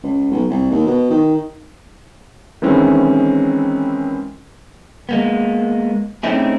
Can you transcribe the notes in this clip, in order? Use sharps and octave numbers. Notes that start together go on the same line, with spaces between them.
C#2
B1
C2
D#2
B2
D#3
D#3 E3 G#3 C4 C#4 E4
G#3 A#3 B3
A3 C4 C#4 D#4 E4 G#4